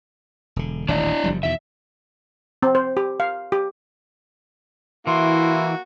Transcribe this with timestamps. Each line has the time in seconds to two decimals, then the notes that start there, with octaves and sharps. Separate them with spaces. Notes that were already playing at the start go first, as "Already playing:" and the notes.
0.56 E1 D3
0.89 D#1 A1 D#3 D4 D5 D#5
1.24 F#1 F3 G3
1.43 E2 B2 D#3 E5
2.63 C4
2.75 C5
2.97 G4
3.20 F5
3.52 G4
5.07 E3 A#3 E4 F#4 C6